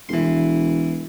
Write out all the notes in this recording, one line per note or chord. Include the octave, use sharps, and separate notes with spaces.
E1 E3 C6